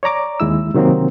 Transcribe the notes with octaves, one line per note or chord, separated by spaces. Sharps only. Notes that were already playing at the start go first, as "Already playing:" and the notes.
C#5 D5 A#5 D6
D#2 G#3 E4 E6
C3 D#3 F#3 A#3 C4